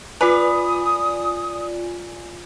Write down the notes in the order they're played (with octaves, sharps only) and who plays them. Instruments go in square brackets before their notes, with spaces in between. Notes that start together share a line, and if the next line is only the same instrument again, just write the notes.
[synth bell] F4 D5 G#5 [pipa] B4 [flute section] D#6